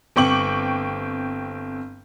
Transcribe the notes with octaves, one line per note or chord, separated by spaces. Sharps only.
G1 C4 G5 C#6 D6 F#7